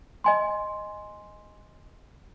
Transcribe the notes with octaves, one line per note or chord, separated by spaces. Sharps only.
D#5 G#5 C6